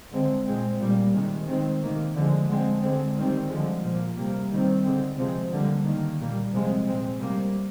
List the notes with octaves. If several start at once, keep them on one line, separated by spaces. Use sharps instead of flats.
D3 G#3 C4
A#2 G#3 C4
A#2 G3 A#3
C3 D#3 G#3
D#3 G#3 C4
C3 D#3 A#3
D3 F3 G#3
D3 G#3 C4
D3 G#3 C4
D#3 G3 C4
D3 F3 G#3
A#2 F3 A#3
C3 G3 A#3
D#3 G3 C4
D3 G#3 C4
C3 F3 G#3 C4
D3 G3 A#3
D#3 A#3
A#2 G3 A#3
C3 F3 G#3 C4
A#2 G#3 C4
C3 G3 A#3